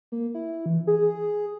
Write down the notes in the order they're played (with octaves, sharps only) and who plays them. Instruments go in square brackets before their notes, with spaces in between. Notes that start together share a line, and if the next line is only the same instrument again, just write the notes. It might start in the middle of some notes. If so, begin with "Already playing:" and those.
[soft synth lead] A#3
E4
E3
G#4